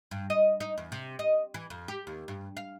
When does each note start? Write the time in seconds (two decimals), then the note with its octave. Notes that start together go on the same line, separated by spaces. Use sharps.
0.11 G2
0.30 D#5
0.60 D#4
0.78 E2
0.92 C3
1.19 D#5
1.54 E3
1.70 F2
1.88 G4
2.07 D#2
2.28 G2
2.57 F5